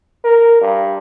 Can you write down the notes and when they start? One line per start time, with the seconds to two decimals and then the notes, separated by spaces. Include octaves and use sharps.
0.24 A#4
0.61 G2